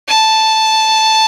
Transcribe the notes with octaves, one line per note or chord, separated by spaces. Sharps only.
A5